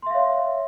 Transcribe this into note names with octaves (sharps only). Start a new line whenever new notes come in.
C#5 E5 F5 C6